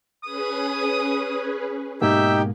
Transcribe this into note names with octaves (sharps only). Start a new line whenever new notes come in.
C#4 G#4 B4 D#6
G#2 B2 A#3 D#4 G4 E5 G5